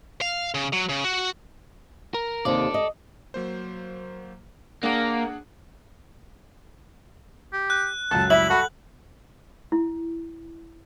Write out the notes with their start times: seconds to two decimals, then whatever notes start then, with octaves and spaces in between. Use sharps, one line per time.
0.21 F5
0.54 C#3
0.73 F#3
0.89 C#3
1.04 F#4
2.14 A#4
2.45 D#2 C3 A4 D5
2.74 D#5
3.34 F#3 A#3 C5
4.83 A#3 D4 G#4 F#5
7.53 G4
7.70 F#6
8.11 C#2 F#2 A4 A5
8.30 G3 E4 E5 F#7
8.50 F#4 A4 F#5 B5
9.72 E4